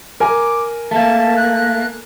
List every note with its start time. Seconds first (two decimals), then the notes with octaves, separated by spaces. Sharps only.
0.20 A#4 G#5 D6
0.91 A3 A#3 A5
1.36 F#6